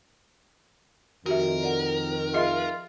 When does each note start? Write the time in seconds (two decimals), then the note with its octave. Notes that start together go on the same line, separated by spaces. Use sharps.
1.26 F2 D#3 F#4 G4 A#4 E5
1.63 D5 F#5
2.34 F4 G#4 D#5 E5